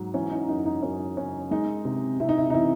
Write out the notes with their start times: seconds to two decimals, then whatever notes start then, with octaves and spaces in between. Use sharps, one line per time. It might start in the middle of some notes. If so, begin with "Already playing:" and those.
Already playing: G#2 F#3
0.14 E3 C#4
0.32 D#4
0.49 F#2 D#4
0.66 D#4
0.83 F#2 C#4
1.17 C#3 C#4
1.51 G#3 D#4
1.85 C3
2.20 C3 E4
2.29 D#4
2.37 E4
2.50 D#4
2.53 E3 E4